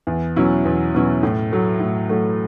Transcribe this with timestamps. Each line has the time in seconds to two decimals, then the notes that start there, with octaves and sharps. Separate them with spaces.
0.07 E2
0.36 B2 F#3 C#4 E4
0.65 E2
0.94 B2 F#3 C#4 E4
1.23 A2
1.51 F#3 A3
1.80 A2
2.09 F#3 A3